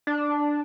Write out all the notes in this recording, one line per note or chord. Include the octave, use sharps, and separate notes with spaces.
D4